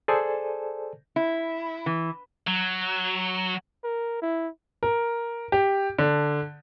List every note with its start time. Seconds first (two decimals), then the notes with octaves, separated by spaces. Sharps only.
0.08 G#4 A4 C5 D5 G#5 A5
1.16 E4
1.86 E3
2.47 F#3
3.83 A#4
4.22 E4
4.83 A#4
5.52 G4
5.99 D3